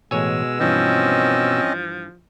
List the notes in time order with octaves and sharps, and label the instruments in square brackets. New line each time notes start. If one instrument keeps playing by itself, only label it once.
[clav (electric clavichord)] A1 C#5 G#5 [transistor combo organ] B2 E6 [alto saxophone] G#3
[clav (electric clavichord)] G2 E3 [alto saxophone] F3 [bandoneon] C4 C#4 D#5